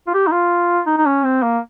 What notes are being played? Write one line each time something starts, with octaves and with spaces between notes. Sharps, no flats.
F4
G4
D#4
F4
D#4
D#4
C#4
C4
A#3